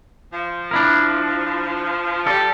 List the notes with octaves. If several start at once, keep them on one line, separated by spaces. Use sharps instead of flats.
F3
D4 E4 A#4
G3 A4